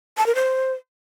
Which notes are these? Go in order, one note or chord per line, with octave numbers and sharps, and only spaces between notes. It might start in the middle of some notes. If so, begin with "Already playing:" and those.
A5
A#4
C5